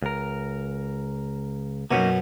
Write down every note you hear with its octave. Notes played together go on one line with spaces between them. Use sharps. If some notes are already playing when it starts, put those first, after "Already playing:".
C#2 A#4
F#2 B2 A#3 C#4 D#4